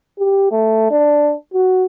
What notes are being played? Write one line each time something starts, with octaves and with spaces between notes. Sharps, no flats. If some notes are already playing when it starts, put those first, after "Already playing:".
G4
A3
D4
F#4